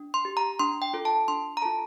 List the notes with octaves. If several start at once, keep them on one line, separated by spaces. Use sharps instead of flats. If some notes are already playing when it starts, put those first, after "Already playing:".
Already playing: D4
C6
G4
A#5
D4 C6
G5
F4 A4
A5
D4 C6
A#5
F4 A4 A5